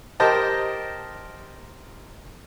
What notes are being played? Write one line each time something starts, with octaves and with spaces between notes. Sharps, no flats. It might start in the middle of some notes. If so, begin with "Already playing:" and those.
G4 A#4 C5 D#5 G5 A5